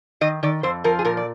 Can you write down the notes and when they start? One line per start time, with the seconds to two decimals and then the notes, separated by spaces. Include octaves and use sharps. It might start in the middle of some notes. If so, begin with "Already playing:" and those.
0.21 D#3 D#5
0.43 D#3 D5
0.63 F2 C5
0.84 F3 A#4
0.99 G#4
1.05 A#2 A#4
1.17 D5